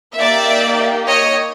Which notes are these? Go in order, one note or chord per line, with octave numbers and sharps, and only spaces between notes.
A#3 D#4 G4 D5 E5
C#5 D#5